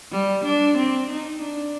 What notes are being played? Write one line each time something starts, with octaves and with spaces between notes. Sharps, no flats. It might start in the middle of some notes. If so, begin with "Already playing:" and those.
G3
D4
C4
D#4
D4